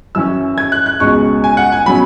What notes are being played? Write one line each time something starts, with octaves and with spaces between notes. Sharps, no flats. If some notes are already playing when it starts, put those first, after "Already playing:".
F#2 E3 C#4 E6
G#6
F#6
F#6
C#2 B2 G#3 C#4 C#6
G#5
F#5
G#5
B2 F#3 C#4 B5